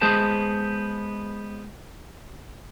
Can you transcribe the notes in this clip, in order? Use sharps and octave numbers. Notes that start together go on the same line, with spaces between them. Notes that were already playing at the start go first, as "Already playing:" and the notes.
G#3 B3 G#4 C5 A5